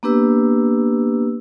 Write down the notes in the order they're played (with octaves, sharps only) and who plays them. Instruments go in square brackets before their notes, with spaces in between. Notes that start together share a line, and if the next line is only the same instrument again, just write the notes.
[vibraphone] A#3 B3 D4 G4 B4 E6